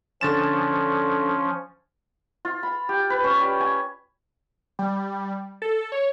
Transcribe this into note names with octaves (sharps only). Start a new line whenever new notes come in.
D3 F3 C#4 A6 E7
F4
B5
G4
B4
C#4
G3
G#5
G3
A4
C#5